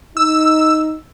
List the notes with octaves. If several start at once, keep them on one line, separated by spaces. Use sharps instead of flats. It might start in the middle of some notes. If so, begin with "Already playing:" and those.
D#4 E6